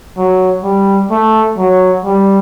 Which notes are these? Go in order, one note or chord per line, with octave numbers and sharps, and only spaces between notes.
F#3
G3
A3
F#3
G3